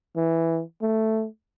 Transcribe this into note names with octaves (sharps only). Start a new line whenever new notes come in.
E3
A3